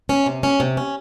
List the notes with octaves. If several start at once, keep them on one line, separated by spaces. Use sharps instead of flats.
C#4
C3
C#4
C3
C#4